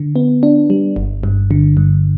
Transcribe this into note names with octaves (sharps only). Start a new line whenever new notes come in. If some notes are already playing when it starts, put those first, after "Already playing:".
Already playing: D3
B3
D4
G3
G1
G2
D3
G2